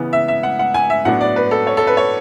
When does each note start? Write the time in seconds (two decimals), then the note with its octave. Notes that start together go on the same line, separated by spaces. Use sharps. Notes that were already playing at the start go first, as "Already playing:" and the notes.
Already playing: C#3 E3 B3
0.13 E5
0.28 E5
0.43 F#5
0.59 F#5
0.74 G#5
0.90 E5
1.05 A2 F#3 B3 D4 F#5
1.21 D5
1.36 B4
1.51 A4
1.67 C#5
1.77 A4
1.87 B4
1.97 C#5